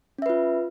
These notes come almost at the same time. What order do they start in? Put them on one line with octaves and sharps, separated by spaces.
C#4 E5 B4 F4